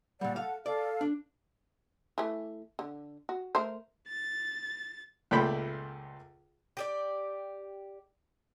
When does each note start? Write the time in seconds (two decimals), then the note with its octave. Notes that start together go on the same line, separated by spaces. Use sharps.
0.21 A#2 G3 D5 F#5
0.36 A4 F5 F#5
0.66 A4 D5 F5
1.01 D4
2.18 E3 A3
2.79 D3
3.29 F#4
3.55 A3 A#4 C5
4.08 A6
5.31 C#2 A#2 A3 D5 G5 B5
6.77 G4 G#4 D5